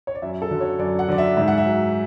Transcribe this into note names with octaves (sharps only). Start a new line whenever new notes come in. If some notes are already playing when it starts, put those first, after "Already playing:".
C#5
D5
F#2 E5
A4
D3 F#3
C#5
F#2 D5
F#5
D3 F#3 D5
E5
G#2 E5
F#5
E5
F#3